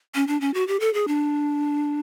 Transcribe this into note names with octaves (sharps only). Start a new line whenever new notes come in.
C#4
D4
C#4
F#4
G4
A4
G#4
D4